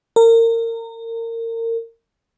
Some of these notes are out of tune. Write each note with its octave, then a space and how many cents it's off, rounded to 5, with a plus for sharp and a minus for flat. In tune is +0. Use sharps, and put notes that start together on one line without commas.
A#4 -30